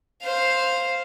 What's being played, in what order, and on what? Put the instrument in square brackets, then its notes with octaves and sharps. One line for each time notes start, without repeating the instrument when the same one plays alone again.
[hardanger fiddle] C5 F5